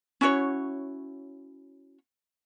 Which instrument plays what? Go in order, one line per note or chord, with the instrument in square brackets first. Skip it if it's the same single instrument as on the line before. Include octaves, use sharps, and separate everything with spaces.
[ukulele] C#4 E4 F#4 C#5